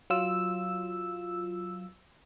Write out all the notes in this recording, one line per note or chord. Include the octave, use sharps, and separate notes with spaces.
F#3 F4 E6